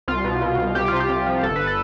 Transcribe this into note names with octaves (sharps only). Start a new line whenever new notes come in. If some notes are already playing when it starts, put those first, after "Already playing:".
C2 F4
B2
B2
C2
C2 G4
C3 F4
G4
C2
F3
G1 A4
B4
A4